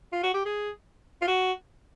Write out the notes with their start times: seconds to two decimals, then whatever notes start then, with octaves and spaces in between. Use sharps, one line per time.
0.13 F4
0.23 F#4
0.34 G4
0.45 G#4
1.22 F4
1.28 F#4